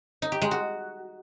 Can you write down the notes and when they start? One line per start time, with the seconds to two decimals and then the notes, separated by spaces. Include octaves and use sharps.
0.22 D#4
0.32 G4
0.42 G#3
0.51 F#4